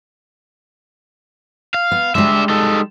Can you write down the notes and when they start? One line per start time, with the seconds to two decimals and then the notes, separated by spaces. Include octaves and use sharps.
1.74 F5
1.91 B3
2.15 G3 G#3 D4 E5
2.49 D#4 A4